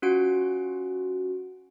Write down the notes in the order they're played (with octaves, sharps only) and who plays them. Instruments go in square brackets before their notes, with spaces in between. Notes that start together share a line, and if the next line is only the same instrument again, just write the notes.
[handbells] C#4 F4 F#4 F#5 D7